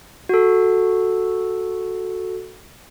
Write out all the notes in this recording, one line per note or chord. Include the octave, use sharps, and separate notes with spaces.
F#4 A4